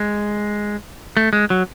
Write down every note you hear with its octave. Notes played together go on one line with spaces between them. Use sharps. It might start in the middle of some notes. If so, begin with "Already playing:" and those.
Already playing: G#3
A3
G#3
F#3